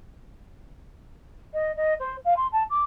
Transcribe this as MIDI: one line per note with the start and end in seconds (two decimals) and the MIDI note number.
1.53 1.71 75
1.76 1.94 75
1.99 2.16 72
2.24 2.34 77
2.36 2.47 84
2.52 2.63 81
2.69 2.84 86